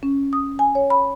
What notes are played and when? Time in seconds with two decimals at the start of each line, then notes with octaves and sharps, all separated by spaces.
0.03 C#4
0.33 D#6
0.59 G#5
0.75 C#5
0.90 B5